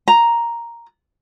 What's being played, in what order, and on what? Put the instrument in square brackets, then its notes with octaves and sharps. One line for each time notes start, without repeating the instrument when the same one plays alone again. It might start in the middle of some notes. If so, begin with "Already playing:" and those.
[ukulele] A#5